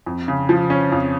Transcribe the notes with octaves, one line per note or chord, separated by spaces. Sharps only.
F2
C#3
F3
C#4
F2